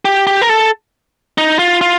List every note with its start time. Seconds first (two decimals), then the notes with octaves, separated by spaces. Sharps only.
0.05 G4
0.27 G4
0.42 A#4
0.49 A4
1.38 D#4
1.59 F4
1.81 F4